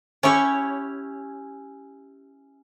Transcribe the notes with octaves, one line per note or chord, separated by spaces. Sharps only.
C#4 E4 G4 C#5